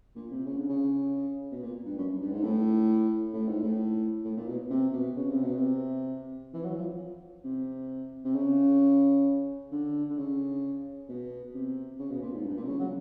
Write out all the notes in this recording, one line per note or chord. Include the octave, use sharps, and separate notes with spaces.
A#2
C3
C#3
D3
C#3
B2
A#2
G2
F#2
G2
G#2
A2
A2
G#2
A2
A2
A#2
B2
C3
B2
C#3
C3
B2
C3
E3
F#3
F3
C3
C3
C#3
D3
D3
C#3
B2
C3
C#3
B2
A#2
G#2
G2
A#2
C3
C#3
F#3